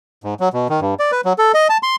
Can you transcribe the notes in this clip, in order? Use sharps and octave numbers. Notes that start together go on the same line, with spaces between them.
G#2
F#3
B2
D#3
G2
D5
B4
F#3
A4
D#5
A5
C6